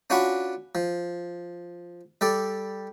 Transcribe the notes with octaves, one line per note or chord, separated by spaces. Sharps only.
C#4 D4 F4 F#4 F#5 B5
F3
G3 A4 D5